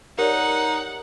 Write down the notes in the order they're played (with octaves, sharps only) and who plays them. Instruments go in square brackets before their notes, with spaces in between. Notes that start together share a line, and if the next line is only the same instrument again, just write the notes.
[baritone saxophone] D#4 [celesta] G4 C#5 D5 [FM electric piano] A#4 [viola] F#5